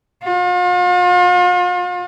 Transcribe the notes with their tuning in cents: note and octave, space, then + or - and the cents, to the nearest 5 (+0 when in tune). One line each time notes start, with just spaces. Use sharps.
F4 +40